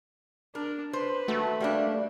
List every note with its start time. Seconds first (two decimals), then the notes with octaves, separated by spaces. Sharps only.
0.55 D4 A#4
0.93 B4 C5
1.28 D#3 A3 F#4
1.60 G3 A#3 D4